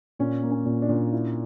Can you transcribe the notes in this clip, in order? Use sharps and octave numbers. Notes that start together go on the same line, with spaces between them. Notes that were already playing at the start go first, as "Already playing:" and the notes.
A#2 C#4
A#3
C#4
A#2
D4
A#2
E4